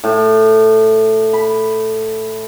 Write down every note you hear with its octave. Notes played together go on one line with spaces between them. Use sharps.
A2
B5